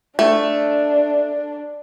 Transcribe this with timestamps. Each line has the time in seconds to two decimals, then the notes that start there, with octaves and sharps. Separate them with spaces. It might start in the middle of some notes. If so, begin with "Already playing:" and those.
0.19 A3 D4